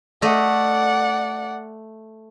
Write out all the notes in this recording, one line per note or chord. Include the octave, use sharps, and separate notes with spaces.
A3 D5 D#5 F#5